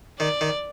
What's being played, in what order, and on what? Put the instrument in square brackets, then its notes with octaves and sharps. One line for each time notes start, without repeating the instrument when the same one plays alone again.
[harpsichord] D#3 [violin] D5
[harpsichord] D#3